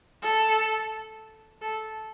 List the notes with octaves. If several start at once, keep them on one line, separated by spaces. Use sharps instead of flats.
A4
A4